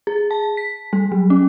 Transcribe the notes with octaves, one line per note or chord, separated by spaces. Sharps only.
G#4
A5
B6
G3
F#3
C#4